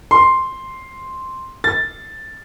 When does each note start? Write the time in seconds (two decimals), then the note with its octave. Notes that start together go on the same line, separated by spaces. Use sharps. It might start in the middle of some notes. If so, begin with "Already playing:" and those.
0.11 C6
1.64 A6